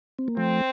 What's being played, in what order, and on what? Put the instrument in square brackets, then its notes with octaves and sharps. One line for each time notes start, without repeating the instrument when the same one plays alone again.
[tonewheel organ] C4
A#3
[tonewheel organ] F3 A3 [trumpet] C4